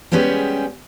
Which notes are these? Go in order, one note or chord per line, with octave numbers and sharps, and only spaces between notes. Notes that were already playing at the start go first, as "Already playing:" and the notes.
G3 G#3 B3 C#4 G4 G#4